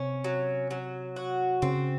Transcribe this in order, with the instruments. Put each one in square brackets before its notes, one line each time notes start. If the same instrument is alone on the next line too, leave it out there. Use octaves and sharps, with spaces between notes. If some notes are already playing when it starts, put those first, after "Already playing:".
Already playing: [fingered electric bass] C3 [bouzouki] C#4
[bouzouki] F#3
F#3
F#4
[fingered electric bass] C#3 [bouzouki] C4